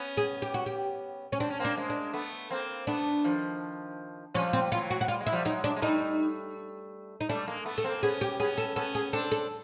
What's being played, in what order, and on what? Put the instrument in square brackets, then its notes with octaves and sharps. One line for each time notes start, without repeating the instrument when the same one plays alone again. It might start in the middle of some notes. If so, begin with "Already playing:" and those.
Already playing: [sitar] B3 C#4
[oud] G#4
G4
F#4
G4
C#4
[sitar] C4 [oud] D4
[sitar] C#4
[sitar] A#3 C4 [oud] D4
[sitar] G#3 A#3
[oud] D4
[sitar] A3 B3
A#3 C4
[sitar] A3 B3 [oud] D4
[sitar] D#3 F3
[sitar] F3 G3 [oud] C#4
[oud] C4
[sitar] E3 F#3 [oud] F4
[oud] F#4
F#4
[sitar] G3 [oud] F4
[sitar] G#3
[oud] E4
[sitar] F3 G3
[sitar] F#3 G#3 [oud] D#4
[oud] D4
[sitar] G#3
[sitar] G3 A3 [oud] D#4
[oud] D#4
[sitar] G3 A3 [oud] D4
[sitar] G#3 A#3
A3 B3
[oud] A4
[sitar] A#3 C4
[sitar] B3 C#4 [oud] G#4
[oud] G4
[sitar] B3 C#4 [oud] G#4
[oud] A4
[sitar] B3 C#4 [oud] A4
[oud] G#4
[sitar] C4 D4 [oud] A4
[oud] A4